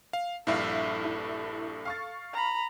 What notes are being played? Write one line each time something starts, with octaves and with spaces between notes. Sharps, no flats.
F5
A#1 G2 E4 A4 E5 F5
E4
F5 C#6 A6
A#5 B5